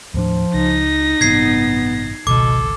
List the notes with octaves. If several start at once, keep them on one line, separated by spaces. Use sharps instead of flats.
D#2 A2 F3 D4
C#2 D#4 A#6
A1 G2 C3 B3 G#6 C7
G#1 C#2 B2 A4 D6